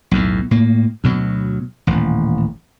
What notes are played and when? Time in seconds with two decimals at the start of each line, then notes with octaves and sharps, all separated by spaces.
0.11 B1 E2 A2
0.51 A2 A#3
1.04 D2 B2 F#3
1.87 D#1 A1